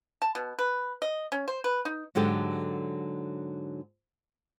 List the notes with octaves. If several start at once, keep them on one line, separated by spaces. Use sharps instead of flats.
A5
B2
B4
D#5
C#4
C5
B4
D#4
G#2 D3 F#3 G4 A4